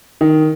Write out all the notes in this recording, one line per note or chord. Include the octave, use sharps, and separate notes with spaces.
D#3